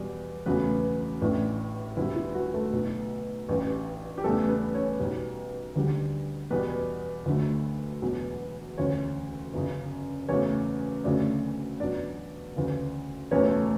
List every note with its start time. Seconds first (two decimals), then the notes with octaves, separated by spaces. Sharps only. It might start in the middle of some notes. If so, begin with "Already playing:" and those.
Already playing: E2 B2 G3
0.46 E1 E2 C#3 F#3 A3 B3 B4
1.21 A1 A2 E3 B3 D4
1.97 D2 D3 G3 B3 E4
2.16 E4
2.35 F#3 F#4
2.54 A3 A4
2.73 B1 B2 F#3 B3
3.49 A1 G2 E3
4.18 G4
4.24 E2 C#3 G3 A3 B3 A4
4.49 B3 B4
4.74 C#4 C#5
4.99 B1 B2 G3 B3
5.76 D2 D3 G3
6.50 E2 B2 G3 B3 B4
7.26 D2 D3 F#3 A3
8.02 E1 E2 B2 F#3 B3
8.78 E1 D2 C#3 C#4 C#5
9.54 G1 F#2 C#3
10.29 F#1 E2 C#3 F#3 A3 C#4 C#5
11.04 D2 C#3 F#3 A3 D4 D5
11.80 E2 B2 F#3 D4 D5
12.55 D2 C#3 E3
13.31 F#1 E2 B2 A3 C#4 C#5
13.50 A3 A4